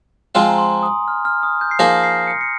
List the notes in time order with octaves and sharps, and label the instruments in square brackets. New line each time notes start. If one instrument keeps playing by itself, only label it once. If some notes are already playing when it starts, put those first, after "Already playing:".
[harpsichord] F3 G#3 C4 F4
[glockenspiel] G#5
A#5
C6
D#6
F6
F6
D#6
G6
C7
[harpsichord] F3 A#3 D#4 G#4 [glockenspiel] A#6
[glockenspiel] C7
C#7
C#7